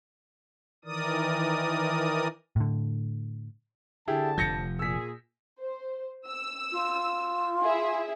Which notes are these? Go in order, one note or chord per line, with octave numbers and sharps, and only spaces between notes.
D#3 E3 A#4 D5 D#6
A2 D3
D3 E4 G4 G#4 A5
F1 C3 F3 G6 A#6 C#7
A#2 G#4 E6 B6
C5
E6
F4
E4 G#4 E5